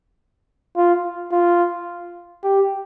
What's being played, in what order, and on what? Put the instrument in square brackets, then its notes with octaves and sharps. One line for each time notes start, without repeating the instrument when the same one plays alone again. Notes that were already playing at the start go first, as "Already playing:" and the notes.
[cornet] F4
F4
G4